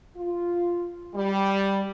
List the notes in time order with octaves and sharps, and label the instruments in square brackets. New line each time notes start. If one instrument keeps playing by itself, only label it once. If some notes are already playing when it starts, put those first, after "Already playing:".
[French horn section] F4
G3